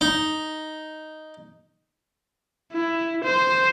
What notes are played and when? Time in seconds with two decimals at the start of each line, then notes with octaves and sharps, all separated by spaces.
0.01 D#4
2.72 E4
3.24 C5